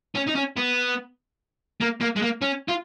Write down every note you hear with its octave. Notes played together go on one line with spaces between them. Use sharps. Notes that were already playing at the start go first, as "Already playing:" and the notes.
C#4
D#4
C#4
B3
A#3
A#3
G#3
A#3
C#4
F4